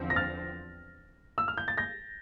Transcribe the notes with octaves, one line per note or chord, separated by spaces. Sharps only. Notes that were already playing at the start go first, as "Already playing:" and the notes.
Already playing: E2 D3 F3 C4
A#6
F6 A6
E6
F6
G6
A6
G6 A#6